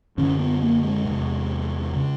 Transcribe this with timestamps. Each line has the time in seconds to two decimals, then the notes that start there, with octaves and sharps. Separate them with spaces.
0.18 F#2 D3 C#4
0.39 B3
0.62 A#3
0.83 G#3
1.05 E2 C3
1.93 C#3